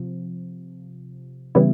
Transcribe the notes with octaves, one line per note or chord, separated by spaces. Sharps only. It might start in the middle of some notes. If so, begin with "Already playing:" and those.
Already playing: C3 F3
C#3 E3 G3 B3 E4